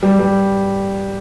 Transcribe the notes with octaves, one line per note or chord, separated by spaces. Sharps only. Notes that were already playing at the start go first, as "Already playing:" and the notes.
G3
G3